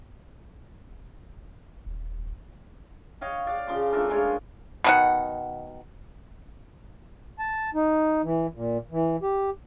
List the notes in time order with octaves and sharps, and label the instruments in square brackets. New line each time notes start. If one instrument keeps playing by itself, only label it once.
[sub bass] D#1
[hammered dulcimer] C#5 D#5 F5 G5
D5 F5 F#5
C#3 F3 C6 D6
A3 D4 F4 A#4
G#3 A#3 G#4 C#5
[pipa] B2 D#3 F#5
[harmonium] A5
D#4
E3
A#2
E3
G4